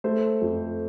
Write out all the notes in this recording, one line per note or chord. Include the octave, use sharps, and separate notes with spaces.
A3 C5
F2